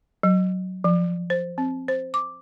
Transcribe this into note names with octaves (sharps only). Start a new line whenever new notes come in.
F#3
F3
C5
C4
C5
D6